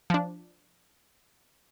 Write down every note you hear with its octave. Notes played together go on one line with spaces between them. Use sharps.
F3 D4